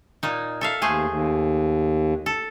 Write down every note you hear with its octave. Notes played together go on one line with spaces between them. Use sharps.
A#2 A#3 D#4
A4 E5 F5
D#2 A3 G#4 C5
D#2
A4